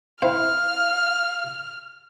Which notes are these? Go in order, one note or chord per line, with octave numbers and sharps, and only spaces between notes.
C4 E4 C5 F5 F6